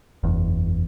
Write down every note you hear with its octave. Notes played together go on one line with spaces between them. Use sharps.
F#1 E2